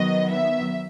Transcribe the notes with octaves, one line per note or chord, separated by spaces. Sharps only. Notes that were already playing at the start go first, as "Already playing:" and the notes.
Already playing: D#3 F#3 B3 D#5
E5